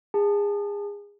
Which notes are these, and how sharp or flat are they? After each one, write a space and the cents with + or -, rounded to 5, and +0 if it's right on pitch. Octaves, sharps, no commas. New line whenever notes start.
G#4 -25 A5 +0